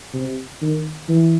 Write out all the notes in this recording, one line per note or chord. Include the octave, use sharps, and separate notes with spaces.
C3
D#3
E3